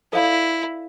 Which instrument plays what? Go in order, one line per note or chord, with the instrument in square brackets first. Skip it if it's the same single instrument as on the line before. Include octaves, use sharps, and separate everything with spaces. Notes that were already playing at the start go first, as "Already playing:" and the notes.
[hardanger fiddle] E4 [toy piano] A4 D5 F5